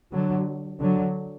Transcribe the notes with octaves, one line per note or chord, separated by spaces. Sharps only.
D3 F#3
D3 F#3